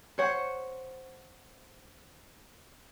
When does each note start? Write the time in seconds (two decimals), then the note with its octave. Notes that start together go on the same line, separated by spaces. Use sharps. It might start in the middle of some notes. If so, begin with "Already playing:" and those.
0.18 C5 C#5 F#5